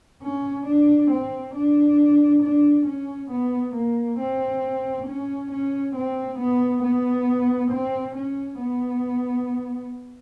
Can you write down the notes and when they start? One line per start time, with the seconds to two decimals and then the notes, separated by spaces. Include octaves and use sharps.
0.23 C#4
0.67 D4
1.11 C4
1.55 D4
2.43 D4
2.87 C#4
3.31 B3
3.75 A#3
4.19 C4
5.07 C#4
5.51 C#4
5.95 C4
6.39 B3
6.84 B3
7.72 C4
8.16 C#4
8.59 B3